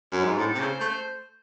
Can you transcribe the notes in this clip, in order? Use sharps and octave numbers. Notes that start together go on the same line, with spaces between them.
F#2
G#2
A2 A4
C3
C#3 C5
A3 C5